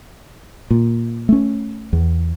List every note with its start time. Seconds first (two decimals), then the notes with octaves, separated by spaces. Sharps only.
0.71 A#2
1.29 A3 C#4
1.93 E2